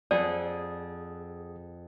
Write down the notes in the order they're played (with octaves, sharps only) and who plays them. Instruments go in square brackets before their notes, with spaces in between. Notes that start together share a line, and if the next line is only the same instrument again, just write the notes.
[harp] F2 [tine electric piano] G#4 F#5 D#6 [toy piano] D5